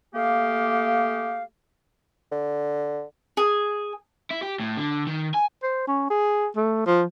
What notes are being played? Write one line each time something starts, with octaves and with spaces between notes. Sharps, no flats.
A3 A#3 G4 G#4 F5
D3
G#4
E4
G4
A2
D3
D#3
G#5
C5
C#4
G#4
A3
F3